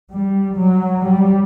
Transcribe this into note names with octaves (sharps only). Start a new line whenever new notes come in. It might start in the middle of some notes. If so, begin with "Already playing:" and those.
G3
F#3
G3